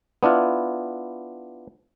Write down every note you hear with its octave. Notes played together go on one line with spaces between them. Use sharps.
B3 D4 E4 F4